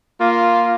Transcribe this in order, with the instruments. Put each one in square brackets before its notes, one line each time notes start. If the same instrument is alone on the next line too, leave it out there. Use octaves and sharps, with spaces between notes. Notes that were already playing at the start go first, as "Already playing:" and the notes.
[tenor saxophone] A#3 [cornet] F4